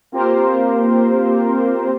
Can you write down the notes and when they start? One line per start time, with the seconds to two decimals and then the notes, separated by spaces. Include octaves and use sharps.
0.12 A#3 C4 F4 G4 A#4 C5